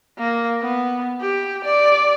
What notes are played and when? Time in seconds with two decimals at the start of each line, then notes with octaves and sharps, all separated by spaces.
0.19 A#3
0.62 B3
1.21 G4
1.64 D5